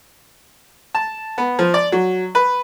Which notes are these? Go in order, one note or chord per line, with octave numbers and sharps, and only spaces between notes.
A5
B3
F3
D5
F#3
B4